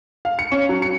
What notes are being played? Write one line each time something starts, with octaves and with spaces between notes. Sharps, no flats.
F5
C#7
C#4
F#3
C#7